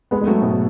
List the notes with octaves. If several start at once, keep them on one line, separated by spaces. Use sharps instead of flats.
G#3 B3
G#3
F#3 A3
G#2 B2